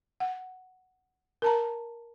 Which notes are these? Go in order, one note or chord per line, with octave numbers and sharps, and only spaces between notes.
F#5
A#4 A5 A#5